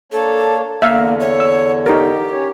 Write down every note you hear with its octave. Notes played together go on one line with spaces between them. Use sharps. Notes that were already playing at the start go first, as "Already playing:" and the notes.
A#3 D4 A4 C#5
E2 D3 A#3 E5 F5
C#5
E6
D#4 G4 A#4
C#4 C#5